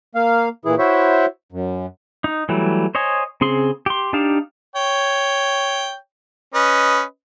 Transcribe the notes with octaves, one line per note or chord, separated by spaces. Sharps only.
A#3 F5
A#2 E3 E4 G#4
E4 F#4 C5 C#5 E5
F#2
D#4
E3 F#3 G3 A3
C5 C#5 D#5 G#5
C#3 C4 G#4 C6
G4 C6
D4 D#4 G4 F5 A5
C#5 G5
C#4 B4 D#5